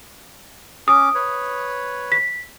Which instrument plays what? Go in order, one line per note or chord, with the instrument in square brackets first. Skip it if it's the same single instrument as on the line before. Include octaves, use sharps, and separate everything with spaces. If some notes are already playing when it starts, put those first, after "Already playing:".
[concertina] C#4 D6 [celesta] D#6
[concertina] B4 C#5
[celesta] B6